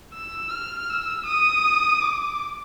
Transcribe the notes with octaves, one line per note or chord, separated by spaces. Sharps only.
E6
F6
E6
D#6
D6